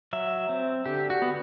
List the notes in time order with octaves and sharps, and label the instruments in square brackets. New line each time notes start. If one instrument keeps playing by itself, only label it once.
[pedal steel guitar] F#3 E5
C4
D3 G4
F#4
B3